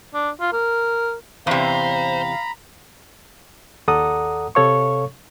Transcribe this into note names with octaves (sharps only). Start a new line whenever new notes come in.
D4
F4
A#4
E2 C3 C5 F5 A#5 B5
D#2 A4 D5 F#5 A#5 D#6
C3 A4 C#5 F5 C#6